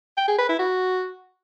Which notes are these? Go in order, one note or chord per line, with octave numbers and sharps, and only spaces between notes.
G5
G#4
B4
E4
F#4